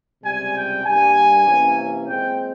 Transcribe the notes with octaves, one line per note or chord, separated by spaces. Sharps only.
C#2 C3 G3 G#5
G5
G2 G3 A#3 G#5
C3 E3 A#3 C#4
A#2 G#3 C4 G5